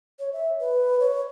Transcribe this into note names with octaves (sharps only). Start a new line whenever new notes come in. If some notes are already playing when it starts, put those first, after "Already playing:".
C#5
E5
B4
C#5